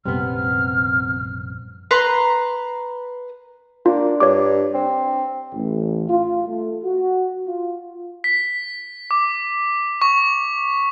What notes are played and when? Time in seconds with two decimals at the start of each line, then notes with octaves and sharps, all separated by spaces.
0.06 A#1 F#2 C3 G3 B3 F6
1.91 B4 A#5 C6
3.86 A#3 D4 F4
4.20 G2 C#5 D6
4.74 C4
5.51 A1
6.08 F4
6.46 A3
6.83 F#4
7.47 F4
8.24 B6
9.11 D6
10.02 C#6